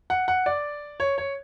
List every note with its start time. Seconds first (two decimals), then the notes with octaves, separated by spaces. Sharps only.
0.10 F#5
0.28 F#5
0.46 D5
1.00 C#5
1.18 C#5